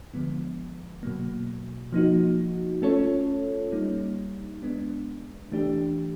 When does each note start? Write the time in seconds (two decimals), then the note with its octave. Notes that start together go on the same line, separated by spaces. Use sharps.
0.14 D3 F3 G#3 B3
1.03 B2 F#3 A#3
1.92 F3 A#3 D#4 F#4
2.82 A3 C#4 F4 A4 C#5
3.72 G3 A#3 D#4
4.62 G#3 B3 D4
5.52 E3 A3 D4 G4